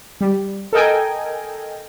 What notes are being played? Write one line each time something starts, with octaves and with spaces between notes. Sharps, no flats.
G3
A4 A#4 D#5 G5 G#5